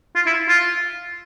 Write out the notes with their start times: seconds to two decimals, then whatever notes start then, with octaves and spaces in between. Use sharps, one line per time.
0.15 F4
0.26 E4
0.48 F4